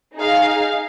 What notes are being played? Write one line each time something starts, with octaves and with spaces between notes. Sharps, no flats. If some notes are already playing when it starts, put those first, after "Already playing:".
D#4 G#4 F5